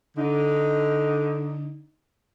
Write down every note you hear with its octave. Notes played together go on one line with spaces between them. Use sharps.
D3 D#4